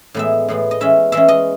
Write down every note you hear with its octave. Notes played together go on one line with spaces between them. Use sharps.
A2 E3 G#3 B3 E5
A2 E3 G#3 B3
D#5
E3 G#3 C#4 E5
E3 G#3 C#4 E5
D#5